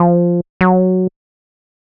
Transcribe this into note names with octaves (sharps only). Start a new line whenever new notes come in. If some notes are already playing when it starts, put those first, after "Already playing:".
Already playing: F3
F#3